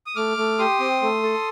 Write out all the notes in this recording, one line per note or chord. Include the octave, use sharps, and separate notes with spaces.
D#6
A3 D6 F6
A3
G4 C6 D#6
C4
A3
A4